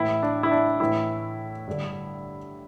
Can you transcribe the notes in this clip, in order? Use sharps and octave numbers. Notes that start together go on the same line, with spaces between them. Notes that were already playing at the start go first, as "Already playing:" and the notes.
Already playing: A2 E3 E4
D4
E4
D4
A2 E3 E4
G2 D3